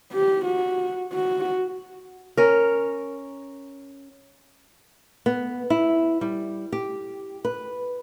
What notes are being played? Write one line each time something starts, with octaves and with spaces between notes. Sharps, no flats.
G4
F#4
F#4
C#4 A#4
B3
E4
G3
G4
B4